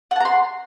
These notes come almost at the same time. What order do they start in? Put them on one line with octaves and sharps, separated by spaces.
F#5 A5 A#5 C6